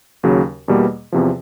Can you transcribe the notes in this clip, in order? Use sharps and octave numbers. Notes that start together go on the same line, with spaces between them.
D#2 C#3 F#3
E2 B2 G3 A#3
E2 C3 F3